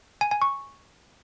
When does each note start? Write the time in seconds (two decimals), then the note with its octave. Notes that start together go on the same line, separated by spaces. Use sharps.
0.21 G#5
0.31 G#5
0.42 C#6